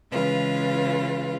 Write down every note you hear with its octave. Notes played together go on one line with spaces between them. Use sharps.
C#3 E3 G#3 F4 B4